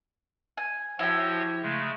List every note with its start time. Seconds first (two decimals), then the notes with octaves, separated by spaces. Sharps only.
0.57 G#5
0.99 F3 E4 F#4 G4 C#5
1.62 C#3 G#3 A3